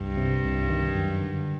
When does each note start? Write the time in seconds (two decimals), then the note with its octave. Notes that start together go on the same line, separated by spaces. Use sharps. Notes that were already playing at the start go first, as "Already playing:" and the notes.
Already playing: C2 G2
0.17 C3
0.44 C2
0.70 D#3
0.95 F#2
1.21 D3